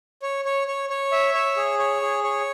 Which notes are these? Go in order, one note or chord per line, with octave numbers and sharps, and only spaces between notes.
C#5
C#5
C#5
C#5
E5
C#5
G#4
C#5
G#4
C#5